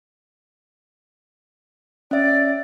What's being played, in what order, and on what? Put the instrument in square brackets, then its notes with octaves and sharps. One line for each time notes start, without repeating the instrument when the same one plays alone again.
[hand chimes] C#4 E5 [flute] D5